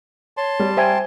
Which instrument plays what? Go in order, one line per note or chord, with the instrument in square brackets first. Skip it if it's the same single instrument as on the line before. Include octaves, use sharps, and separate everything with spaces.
[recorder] C#5 [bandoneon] A5 C6
[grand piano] G3
[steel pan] C5 E5 G#5 [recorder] G5